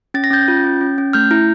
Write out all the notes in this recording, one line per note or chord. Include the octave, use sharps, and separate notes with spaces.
C#4 A6
A#6
C#4 G6 A6
F4
C#4
C#4
C#4
A3 F6 G6
E4